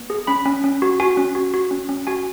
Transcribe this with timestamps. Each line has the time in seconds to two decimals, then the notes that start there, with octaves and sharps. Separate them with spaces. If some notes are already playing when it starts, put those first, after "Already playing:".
Already playing: B3
0.10 G#4
0.27 C#4 B5
0.45 C#4
0.64 C#4
0.82 F#4
1.00 F#4 G#5
1.17 C#4
1.35 F#4
1.54 F#4
1.71 C#4
1.89 C#4
2.07 F#4 G#5